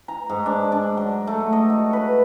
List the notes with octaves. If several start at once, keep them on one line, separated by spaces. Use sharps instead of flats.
A#5
G#2
D4
D4
F#3
A3
D#5
F#4
B4